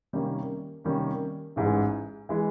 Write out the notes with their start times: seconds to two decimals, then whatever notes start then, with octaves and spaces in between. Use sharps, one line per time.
0.13 C3 D#3 G3 A#3 C#4
0.84 C3 D#3 G3 A#3 C#4
1.56 A1 G#2 E3 G#3
2.29 E3 G#3